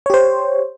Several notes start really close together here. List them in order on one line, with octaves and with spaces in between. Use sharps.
C#5 G4 C5